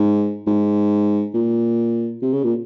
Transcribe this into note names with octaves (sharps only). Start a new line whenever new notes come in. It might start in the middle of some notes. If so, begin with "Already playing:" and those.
Already playing: G#2
G#2
A#2
C3
C#3
A#2